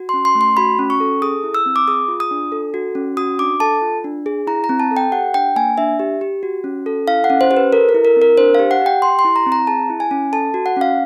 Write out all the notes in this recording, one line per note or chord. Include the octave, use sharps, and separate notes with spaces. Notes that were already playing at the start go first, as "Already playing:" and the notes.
Already playing: F#4
C6
C#4
C6
A3
C6
F#4 B5
C#4
C#6
A4
G#4 D#6
E4
E6
C4
D6
G#4 D#6
F4
D#6
D4
A4
F#4
C#4
F#4 D#6
D4 D6
A4 A5
F4
D4
G#4
E4 A#5
A#5
C4
A5
A4
G5
G4 F#5
D4 G5
A#3 G#5
D4 E5
G4
G4
F#4
C#4
A4
E4 F5
F#5
C#4
C5
G4 C5
B4
A4 A#4
A#4
E4
A#4
C4
A#4
D4 C5
F5
G4
F#5
G4 G5
G4 C6
C6
E4
A#5
C4
A#5
G#4 A5
E4
G#5
C#4
A4 A5
F#4
F#5
C#4 F5